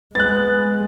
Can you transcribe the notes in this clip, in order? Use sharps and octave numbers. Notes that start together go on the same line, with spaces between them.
G#3 B3 F#6 A6